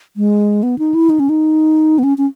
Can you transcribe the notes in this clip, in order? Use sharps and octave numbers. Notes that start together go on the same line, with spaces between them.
G#3
B3
D#4
E4
D#4
C#4
D#4
B3
C#4
C#4